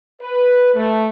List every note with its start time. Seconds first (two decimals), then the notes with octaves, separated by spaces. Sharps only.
0.21 B4
0.74 A3